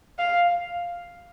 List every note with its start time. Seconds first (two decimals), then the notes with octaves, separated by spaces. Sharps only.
0.19 F5